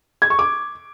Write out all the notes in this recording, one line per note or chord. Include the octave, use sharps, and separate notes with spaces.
G#6
C#6
D6